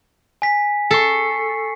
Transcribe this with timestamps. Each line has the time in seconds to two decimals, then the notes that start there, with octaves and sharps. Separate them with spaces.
0.42 G#5 B6
0.91 A4 C#6 C7 C#7